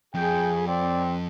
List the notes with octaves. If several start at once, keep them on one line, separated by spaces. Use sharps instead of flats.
F2 G#4 G5
C4 D5